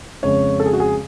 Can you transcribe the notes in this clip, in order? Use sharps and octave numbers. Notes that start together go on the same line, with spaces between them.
F2 C#3 G#3 C#5
A4
G#4
F#4
G#4